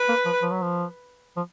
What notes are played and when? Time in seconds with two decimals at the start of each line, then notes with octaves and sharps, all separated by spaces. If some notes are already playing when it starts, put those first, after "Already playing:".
Already playing: B4
0.09 A#3
0.26 F3
0.42 F3
0.51 F#3
0.62 F3
1.37 F3